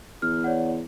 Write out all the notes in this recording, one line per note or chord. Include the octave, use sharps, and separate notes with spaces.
E2 F6
C#5 D5 F#5